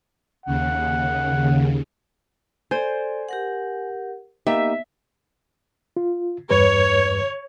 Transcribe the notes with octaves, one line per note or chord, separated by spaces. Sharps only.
D#2 C#3 F#5
A4 C5 D5 G#5
G4 A#4 F#5
A#3 B3 D#4 G4 D#5 E5
F4
E2 G2 B4 C#5